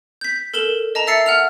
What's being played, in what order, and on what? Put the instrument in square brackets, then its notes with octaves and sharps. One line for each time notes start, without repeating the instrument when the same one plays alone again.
[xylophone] G6 B6
A4 A#4 E7 F#7 G7
D#5 A5 A#5
E5 E6 A6 C7 C#7
F#5 F6 F7